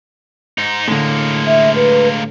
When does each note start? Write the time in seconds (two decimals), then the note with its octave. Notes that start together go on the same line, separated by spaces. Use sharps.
0.58 G#2 D#4
0.88 A2 D3 G#3 A#3
1.46 E5
1.74 B4